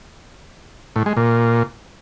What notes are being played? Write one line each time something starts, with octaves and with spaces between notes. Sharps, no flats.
A2
G#3
A#2